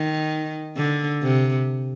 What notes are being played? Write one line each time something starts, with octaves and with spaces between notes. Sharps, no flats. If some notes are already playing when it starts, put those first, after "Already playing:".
Already playing: D#3
D3
C3